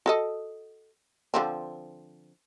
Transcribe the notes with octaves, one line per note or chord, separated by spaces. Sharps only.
F#4 A4 D#5
D3 F3 C4